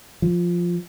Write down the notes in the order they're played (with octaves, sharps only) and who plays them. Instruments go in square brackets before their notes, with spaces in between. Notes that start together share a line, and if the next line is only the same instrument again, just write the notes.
[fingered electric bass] F3